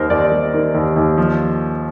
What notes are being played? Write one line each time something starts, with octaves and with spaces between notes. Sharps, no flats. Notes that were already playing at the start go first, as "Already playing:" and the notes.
Already playing: D#2 D#3 G3 A#4 C5
D#2 D5
G3
D#3
D#2
D#2
F3